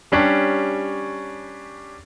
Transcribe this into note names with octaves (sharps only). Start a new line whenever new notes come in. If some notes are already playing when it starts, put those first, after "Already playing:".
G3 C#4 D4 G4 C#5